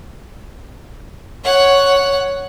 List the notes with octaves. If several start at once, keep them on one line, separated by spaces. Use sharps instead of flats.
C#5 F#5